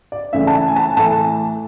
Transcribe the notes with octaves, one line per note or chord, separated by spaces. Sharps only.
D5
C#3 E3 A3 E5
A5
G#5
G#5
A5
A2 E3 A3 A5